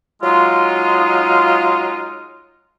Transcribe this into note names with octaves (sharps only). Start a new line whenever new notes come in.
F#3 G#3 D#4 F4